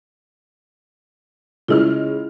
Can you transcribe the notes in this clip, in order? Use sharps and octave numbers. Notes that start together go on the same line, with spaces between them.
C#3 G#3 E4 F4 F6